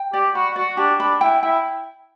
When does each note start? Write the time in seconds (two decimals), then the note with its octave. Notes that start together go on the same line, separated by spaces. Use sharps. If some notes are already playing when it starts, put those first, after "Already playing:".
Already playing: G5
0.13 G4 D5
0.34 F#4 B5
0.56 F#4 D5
0.77 D4 G4
0.99 D4 B5
1.21 E4 G5
1.43 E4 G5